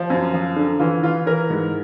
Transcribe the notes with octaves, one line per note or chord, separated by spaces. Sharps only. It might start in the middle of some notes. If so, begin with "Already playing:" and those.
Already playing: F3
F#2
F3
D3
E3 F4
E3 F4
E3 A#4
G#2